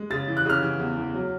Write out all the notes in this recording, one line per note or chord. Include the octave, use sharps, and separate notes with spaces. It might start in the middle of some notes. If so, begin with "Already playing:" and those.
Already playing: G#3
C#3 A6
E3
F#6
C#3 F6
E3
E2
E2
F#3